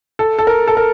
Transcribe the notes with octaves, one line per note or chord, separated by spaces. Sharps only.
A4
A4
A#4
A4
A#4